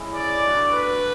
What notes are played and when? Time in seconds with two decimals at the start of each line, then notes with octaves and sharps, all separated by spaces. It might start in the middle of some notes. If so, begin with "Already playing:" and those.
Already playing: G#3 C#4 E4
0.12 D5
0.41 A3 D4 F#4
0.72 B4